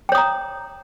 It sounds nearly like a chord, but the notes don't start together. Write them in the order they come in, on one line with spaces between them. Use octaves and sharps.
G5 C#5 D#6 A#5